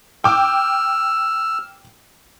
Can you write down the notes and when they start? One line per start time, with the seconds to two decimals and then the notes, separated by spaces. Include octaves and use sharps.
0.24 G5 D6 E6 F6